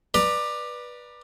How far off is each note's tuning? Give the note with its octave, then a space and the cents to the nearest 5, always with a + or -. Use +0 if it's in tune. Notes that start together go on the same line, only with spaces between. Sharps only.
B4 -15 D5 +15 A#5 +0